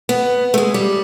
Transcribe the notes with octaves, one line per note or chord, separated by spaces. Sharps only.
B3
A3
G#3
G3